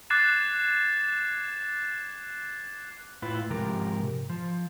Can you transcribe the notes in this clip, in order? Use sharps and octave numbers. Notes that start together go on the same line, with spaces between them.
D6 F#6 G#6 A6 C7 E7
A2 E4 F4 B4
G#2 C3 F3 G4 A#4
F3